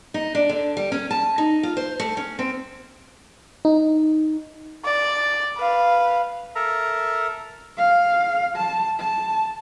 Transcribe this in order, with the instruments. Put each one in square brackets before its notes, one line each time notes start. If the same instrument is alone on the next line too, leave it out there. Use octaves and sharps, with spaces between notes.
[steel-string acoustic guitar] D#4
D4
D3
G3
C#4
A5
D#4
F4
C5
A3
C#4
C4
[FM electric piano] D#4
[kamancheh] D5
B4 F5
[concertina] A4 A#4 E5 A#5
[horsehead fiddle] F5
A5
A5